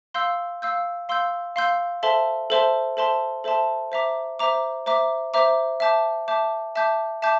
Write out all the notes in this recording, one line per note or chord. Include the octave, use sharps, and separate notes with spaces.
F5 C6 E6 G6
F5 C6 E6 G6
F5 C6 E6 G6
F5 C6 E6 G6
A4 C5 E5 A5 C6
A4 C5 E5 A5 C6
A4 C5 E5 A5 C6
A4 C5 E5 A5 C6
C5 E5 A#5 D6
C5 E5 A#5 D6
C5 E5 A#5 D6
C5 E5 A#5 D6
E5 A5 D6 G6
E5 A5 D6 G6
E5 A5 D6 G6
E5 A5 D6 G6